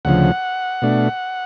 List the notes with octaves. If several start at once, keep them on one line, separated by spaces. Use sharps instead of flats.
D2 C#3 F3 F#5
B2 A3 D4